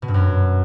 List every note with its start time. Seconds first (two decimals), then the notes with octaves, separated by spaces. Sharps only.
0.02 B2
0.08 G2
0.14 F#2